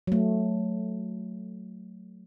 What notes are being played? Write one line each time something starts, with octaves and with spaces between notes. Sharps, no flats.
F#3 A3